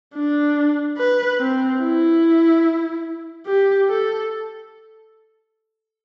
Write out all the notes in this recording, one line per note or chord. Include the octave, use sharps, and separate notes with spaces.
D4
B4
C4
E4
G4
A4